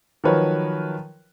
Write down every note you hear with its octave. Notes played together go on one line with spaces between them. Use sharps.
D#3 F3 F#3 A#4 B4 C#5